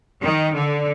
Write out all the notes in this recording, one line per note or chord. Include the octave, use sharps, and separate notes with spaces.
D#3
D3